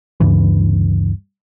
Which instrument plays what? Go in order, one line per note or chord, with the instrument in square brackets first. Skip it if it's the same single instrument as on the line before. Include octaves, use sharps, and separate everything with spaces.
[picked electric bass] D2 G2 C#3 E3